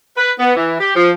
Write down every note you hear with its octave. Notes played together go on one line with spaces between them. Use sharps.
B4
B3
E3
G4
F3